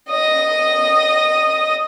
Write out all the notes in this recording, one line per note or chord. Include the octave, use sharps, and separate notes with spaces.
D#5 D#6